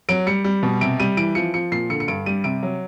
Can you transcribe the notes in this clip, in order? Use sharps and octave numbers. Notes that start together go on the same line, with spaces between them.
F#3 D7
G3 C#7
G3
B2
C3 D7
G3 D#7
E3 D7
F3 C#7
F3 C#7
A#2 C7
D3 C#7
C#7
G2 D7
G3 D#7
C3 D7
F#3